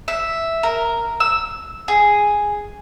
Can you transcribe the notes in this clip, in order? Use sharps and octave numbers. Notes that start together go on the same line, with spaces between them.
E5
A#4
E6
G#4